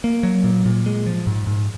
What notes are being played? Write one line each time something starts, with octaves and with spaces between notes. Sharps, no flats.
A#3
F#3
A#2
A#2
G#3
F3
G#2
G#2